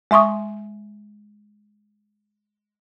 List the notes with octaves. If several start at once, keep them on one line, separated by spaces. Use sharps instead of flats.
G#3 E5 C6 C#6 D#6